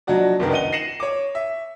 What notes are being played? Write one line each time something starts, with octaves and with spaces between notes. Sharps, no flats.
F3 F#3 D4 D#4 F#4 D5
F#1 C2 D#3 B3 D4 A#4
D#4 F#5 D#7 G7
A#6 C7 C#7 D#7 E7 F#7
C#5 D6
E5